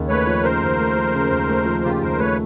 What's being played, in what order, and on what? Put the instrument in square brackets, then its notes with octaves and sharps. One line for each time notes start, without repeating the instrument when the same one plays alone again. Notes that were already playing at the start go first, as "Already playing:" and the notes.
Already playing: [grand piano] D#2 C#3
[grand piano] A3 [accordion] B4 C#5
[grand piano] F3
[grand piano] C#3 [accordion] A#4 C5
[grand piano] D#2
A3
F3
C#3
D#2
A3
F3
[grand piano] C#3 [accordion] F4 G4
[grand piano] D#2 [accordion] A#4 C5
[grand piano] A3 [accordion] B4 C#5